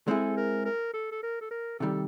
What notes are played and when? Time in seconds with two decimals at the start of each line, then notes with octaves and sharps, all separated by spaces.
0.08 G#3 C4 E4 G#4 A4
0.37 A#4
0.65 A#4
0.94 A4
1.12 A4
1.23 A#4
1.41 A4
1.51 A#4
1.80 C3 D#3 G3 A4